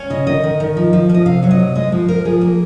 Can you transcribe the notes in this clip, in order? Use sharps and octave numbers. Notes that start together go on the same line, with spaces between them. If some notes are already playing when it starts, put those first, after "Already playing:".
Already playing: C#4
C#3 D#5
D#3 D#5
D#3
D#3
F3
F3
F3 D#5
C3 F5
F#3 C#5
D#5
C3
G#3 D#5
F3 C5
F3 A#4
F3 G#4
A#3